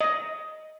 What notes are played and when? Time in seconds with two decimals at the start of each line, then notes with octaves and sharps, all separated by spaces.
0.01 D#5